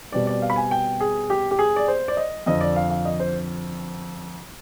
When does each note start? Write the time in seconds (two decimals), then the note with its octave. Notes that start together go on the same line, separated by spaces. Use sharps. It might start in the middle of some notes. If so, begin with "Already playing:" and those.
0.12 B2 G3 C4 D5
0.27 D5
0.42 F5
0.50 B5
0.56 G#5
0.71 G5
1.00 G#4
1.30 G4
1.51 G4
1.59 G#4
1.76 D5
1.88 C5
2.08 D5
2.17 D#5
2.46 F2 D3 F3 C4 D#5
2.61 D5
2.76 F5
2.90 F5
3.05 D#5
3.20 C5